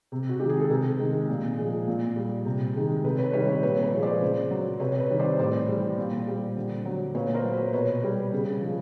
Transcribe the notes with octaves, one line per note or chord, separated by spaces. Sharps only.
C3
F#4
D#3 G#3 G4
G#4
A4
C3 G#4 A#4
D#3 G#3
A#2
F3 G#3
A#2
G3
C3
D#3 G#3
C3 A4 B4
B4 C#5
D#3 G3 B4 C#5
B4 C#5
A#2 B4 C#5
B4 C#5
F3 G#3
C5 D5
C#3
F#3
C3 B4 C#5
B4 C#5
D#3 G3
C5 D5
A2 C5 D5
E3 G3
A#2
G3
D3
F#3
A#2 B4 C#5
A#4 C5
F#3
B4 C#5
B2 B4 C#5
G3
C#3
F3 G#3